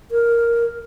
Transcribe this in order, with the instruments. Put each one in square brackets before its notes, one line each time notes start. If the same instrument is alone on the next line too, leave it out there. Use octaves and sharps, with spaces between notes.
[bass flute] A#4